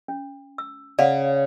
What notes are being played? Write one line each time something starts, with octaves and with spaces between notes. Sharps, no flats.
C#4
E6
C#3 D5 F5 F#5